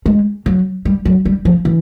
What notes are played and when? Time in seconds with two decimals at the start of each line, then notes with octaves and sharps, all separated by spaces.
0.06 G#3
0.46 F#3
0.85 G3
1.05 F#3
1.25 G3
1.45 F3
1.65 E3